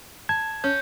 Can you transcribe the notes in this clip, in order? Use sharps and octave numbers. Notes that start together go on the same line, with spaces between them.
A5 G#6
C#4 G6